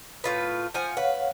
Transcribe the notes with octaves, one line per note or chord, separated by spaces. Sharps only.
A2 F4 B4
F3 F#5 G#5
B4 C#5 F5 F#5